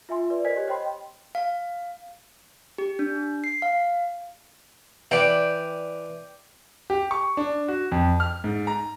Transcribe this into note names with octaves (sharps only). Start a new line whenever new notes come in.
F4 E5 G#5 C6
B4 D5
A#4 C5 D#5 G#5 G#6 B6
G4 C#5
C5 D#5 G5 B5 C6
F5
G4
D4
C7
F5
E3 D5 G5
G4
C#6
D4
F#4
F2
F6
G#2
A#5